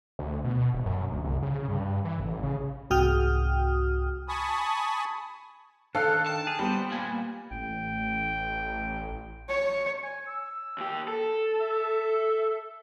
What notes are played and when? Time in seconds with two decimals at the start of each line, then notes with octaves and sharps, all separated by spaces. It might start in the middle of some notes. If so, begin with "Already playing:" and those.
0.19 D2
0.44 B2
0.74 D#1
0.86 F#2
1.12 D2
1.24 C2
1.42 C#3
1.68 G2
2.05 E3
2.20 A1
2.43 C#3
2.90 C2 G#2 F#4 G5 D#6 F6
4.28 G#5 A5 B5 C#6 D#6
5.95 D#3 D4 A4 F5 F6 F#6
6.27 G5 A5
6.47 G#4
6.59 G3 B3 C5
6.92 A#2 G#5
7.51 A1 G5
9.49 C#5
10.03 G#5
10.27 E6
10.78 D#2 G4
11.08 A4
11.61 E5